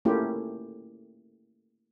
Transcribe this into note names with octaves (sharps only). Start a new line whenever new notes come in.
A3 A#3 C#4 E4 F4 G4